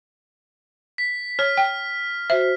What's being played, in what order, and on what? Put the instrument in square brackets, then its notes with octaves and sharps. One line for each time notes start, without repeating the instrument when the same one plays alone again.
[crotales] B6
[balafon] C#5 [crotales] F6
[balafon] G5
[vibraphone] F#4 C5 [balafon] E5